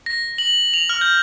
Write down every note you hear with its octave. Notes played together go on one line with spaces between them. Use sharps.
A#6
F#7
F7
F6
G6